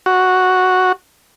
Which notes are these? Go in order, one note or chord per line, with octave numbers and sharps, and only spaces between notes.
F#4